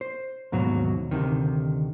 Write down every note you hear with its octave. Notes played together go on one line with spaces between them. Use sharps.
C5
D#2 G#2 B2 F#3
D2 C3 D#3